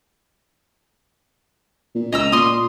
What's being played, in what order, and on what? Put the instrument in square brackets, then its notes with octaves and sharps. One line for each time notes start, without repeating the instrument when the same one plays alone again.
[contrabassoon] A#2
[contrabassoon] C#2 [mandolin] D#5 A#5 E6
[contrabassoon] A#2 [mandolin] C6 D#6